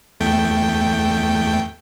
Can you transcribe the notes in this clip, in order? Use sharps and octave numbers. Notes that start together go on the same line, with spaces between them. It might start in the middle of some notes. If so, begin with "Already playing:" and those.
E2 A3 G5